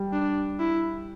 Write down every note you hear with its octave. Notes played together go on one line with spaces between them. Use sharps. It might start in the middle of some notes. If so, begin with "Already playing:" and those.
Already playing: G3
D4
E4